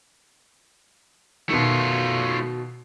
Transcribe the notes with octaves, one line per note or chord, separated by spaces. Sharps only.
B2 D#3 A3 F4